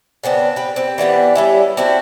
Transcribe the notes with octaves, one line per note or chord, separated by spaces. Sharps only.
C#3 B3 C4 D4
G4 B4
C4 G4
E3 G3 B3 D4
G3 C#4 E4
C4 D4 E4 F#4